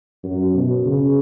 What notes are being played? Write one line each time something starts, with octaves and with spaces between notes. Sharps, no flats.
F#2
B2
C#3